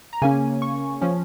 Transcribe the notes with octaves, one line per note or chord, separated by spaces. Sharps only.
A#5
C#3 A#3 C#4 G#5
C#6
F3 C#4